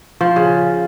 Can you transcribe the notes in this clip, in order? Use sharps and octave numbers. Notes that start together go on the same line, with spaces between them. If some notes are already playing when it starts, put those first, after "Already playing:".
F3
C#3